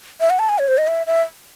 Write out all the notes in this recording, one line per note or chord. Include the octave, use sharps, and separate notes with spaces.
E5
F#5
A5
G#5
C#5
C5
D#5
E5
E5